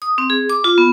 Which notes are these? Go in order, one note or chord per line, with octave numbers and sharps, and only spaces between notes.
D#6
C4
G#4
D6
F4
B3